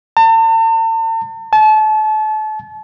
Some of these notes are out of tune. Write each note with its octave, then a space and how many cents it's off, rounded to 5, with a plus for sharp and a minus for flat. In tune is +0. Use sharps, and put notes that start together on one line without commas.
A5 +45
A5 -30